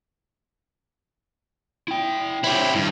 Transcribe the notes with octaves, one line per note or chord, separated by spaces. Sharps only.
E4 G5
E4 G4 C5 C#5 G5
G2 D#3 E4